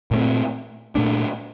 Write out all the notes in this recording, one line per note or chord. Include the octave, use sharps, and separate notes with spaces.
A#2 A3 C4
A#2 A3 D4